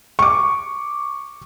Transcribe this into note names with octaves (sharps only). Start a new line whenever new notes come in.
C#6 D6